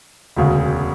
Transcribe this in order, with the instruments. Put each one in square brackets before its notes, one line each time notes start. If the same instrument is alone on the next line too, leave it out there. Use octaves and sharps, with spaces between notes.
[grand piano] E1 D2 C#3